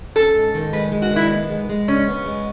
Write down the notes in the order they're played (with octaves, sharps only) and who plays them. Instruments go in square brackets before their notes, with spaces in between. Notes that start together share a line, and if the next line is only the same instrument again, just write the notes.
[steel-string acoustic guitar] C#4 [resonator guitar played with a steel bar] A4
[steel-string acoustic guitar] G#2
D#3
[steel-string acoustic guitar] G#3 [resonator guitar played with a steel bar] B4
[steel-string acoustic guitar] G#3
[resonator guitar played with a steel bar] F#4
[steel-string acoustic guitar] D#3
[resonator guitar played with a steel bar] E4
[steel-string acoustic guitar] B3
G#3
G#3
[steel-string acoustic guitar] C#3 [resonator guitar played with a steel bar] C#4
[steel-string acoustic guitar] B3
G#3